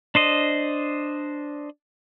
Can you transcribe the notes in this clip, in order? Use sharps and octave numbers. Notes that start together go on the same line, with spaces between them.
D4 C5 D#5